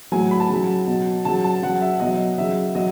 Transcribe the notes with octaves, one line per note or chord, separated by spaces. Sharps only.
A2 F#3 G#5
B5
A5
C#3 F#3
B2 F#3
C#3 F#3 A5
A5
C#3 F#3 F#5
E5
B2 F#3 D#5
C#3 F#3 E5
F#3 D#5